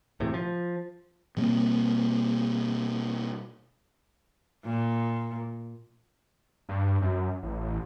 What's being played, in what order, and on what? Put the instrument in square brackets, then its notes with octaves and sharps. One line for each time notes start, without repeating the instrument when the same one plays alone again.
[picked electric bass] E1 C#2 A2 C3
F3
[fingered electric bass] B2 G3 A#3 C4
[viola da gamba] A#2
[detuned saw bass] G2
F#2
A1
A1